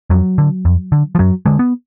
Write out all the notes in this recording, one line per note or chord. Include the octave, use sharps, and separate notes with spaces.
F2 F#3
D3
F2
D3
F3
F#2 F#3
D3 G#3
B3